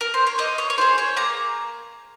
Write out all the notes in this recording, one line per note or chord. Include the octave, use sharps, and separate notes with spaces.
A#4
C5
C#5
A#3 D#5
C#5
C#5
F4 G#4 C5
C#5
A#3 A#5